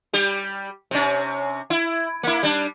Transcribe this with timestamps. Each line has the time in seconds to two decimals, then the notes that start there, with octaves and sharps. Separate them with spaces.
0.13 G3 G4
0.91 C3 C#4
1.70 E4
2.23 A#3 E4
2.43 G3 D4